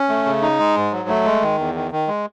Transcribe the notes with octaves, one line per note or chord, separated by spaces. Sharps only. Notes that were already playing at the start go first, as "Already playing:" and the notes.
Already playing: C#4
A3
C#3
D#4
G#3
G#2
F#3
A3
G#3
D#3
E2
D#3
D#3
G#3